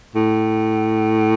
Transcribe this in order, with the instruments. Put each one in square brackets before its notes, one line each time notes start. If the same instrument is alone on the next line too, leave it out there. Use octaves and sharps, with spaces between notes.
[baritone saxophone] A2